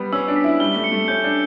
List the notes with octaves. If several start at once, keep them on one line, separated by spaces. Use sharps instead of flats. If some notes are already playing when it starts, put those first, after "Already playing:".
Already playing: G3 B3
C#4 E6
D4
B6
E4
G3 G7
A3
C#7
A3
C#4 G6
D4